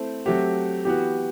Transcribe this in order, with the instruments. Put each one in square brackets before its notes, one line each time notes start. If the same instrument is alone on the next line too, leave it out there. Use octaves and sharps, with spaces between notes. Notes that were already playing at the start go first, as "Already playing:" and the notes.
Already playing: [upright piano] A3 C4 E4 A4 C5
[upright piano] F#3 A3 C4 F#4 [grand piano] G4
[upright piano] E3 B3 F#4 [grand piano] G4